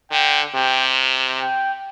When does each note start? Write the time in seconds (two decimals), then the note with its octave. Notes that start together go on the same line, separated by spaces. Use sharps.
0.12 D3 G5
0.55 C3 G5
1.41 G5